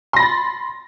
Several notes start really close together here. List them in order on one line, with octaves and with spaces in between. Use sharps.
C6 A#6 B5 A6